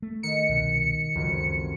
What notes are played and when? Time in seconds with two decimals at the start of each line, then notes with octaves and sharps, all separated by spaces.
0.02 A3
0.23 D#3 C#7
0.49 C2 B2
1.15 F1 C#2 F#2